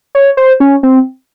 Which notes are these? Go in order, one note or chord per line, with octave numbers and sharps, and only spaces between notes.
C#5
C5
C#4
C4